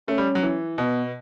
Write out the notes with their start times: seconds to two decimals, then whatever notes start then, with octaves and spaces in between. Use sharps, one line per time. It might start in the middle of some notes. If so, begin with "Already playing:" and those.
0.08 A3 C#4
0.18 G3
0.35 F#3
0.43 E3
0.78 B2 B3